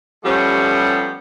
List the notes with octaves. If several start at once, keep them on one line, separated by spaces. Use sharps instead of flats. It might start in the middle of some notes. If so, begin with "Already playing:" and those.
F3 G3 A3 B3 C#4 G4